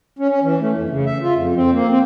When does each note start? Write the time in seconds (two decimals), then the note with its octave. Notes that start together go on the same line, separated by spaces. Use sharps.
0.19 C#4
0.31 C#4
0.43 E3
0.61 A3
0.77 F2
0.90 C#3
1.06 E5
1.22 F4
1.36 F2
1.56 C4
1.72 A#3
1.90 C4